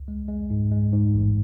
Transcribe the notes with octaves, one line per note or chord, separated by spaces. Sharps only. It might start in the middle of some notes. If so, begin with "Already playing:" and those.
Already playing: C#2
G#3
G#3
G#2
G#3
G#2
A1